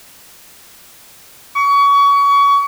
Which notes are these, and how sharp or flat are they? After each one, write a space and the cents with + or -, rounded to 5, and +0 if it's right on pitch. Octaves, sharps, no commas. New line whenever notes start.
C#6 +30